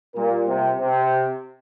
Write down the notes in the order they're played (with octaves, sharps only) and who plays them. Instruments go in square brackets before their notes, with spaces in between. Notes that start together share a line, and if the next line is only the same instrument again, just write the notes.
[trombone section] A#2 [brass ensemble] G3 A#3 F4 A#4
[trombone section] C3
C3